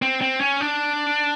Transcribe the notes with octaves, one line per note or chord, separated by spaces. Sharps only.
C4
C4
C#4
D4